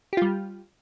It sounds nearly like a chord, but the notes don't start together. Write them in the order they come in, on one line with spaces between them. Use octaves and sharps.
G4 F4 G3